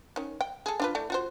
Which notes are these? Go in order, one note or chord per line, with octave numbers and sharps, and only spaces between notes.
D#3 C#4
G5
G#4 A4
D4 F4 B4
A3 E4 D5
F4 F#4 C5